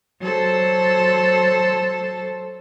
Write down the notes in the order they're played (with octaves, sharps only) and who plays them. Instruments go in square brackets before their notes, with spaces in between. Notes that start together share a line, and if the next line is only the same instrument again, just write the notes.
[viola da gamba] F#3 A4 C5